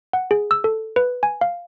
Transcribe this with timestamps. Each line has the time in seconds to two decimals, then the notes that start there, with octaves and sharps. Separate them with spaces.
0.13 F#5
0.31 G#4
0.51 E6
0.64 A4
0.96 B4
1.23 G#5
1.41 F5